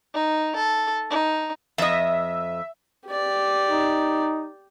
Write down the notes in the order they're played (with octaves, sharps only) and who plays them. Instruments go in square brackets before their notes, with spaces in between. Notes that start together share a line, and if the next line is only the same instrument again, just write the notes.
[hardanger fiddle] D#4
A4
D#4
[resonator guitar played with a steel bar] F2 D#5 [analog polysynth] E5
[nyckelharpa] G4 D5
[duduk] D#4